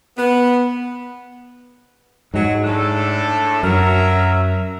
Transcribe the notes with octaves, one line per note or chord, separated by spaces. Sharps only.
B3
G#2 F#3 G#3
A2 D4 A4
F#2 F#3 A#4 E5